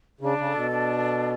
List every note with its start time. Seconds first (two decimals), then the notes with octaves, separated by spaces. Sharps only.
0.21 C#3 D4
0.38 C#3
0.46 A4
0.55 B2
0.70 D4
0.96 A4